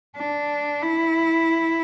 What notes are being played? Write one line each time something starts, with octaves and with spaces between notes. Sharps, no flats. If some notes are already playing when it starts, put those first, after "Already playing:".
D4
E4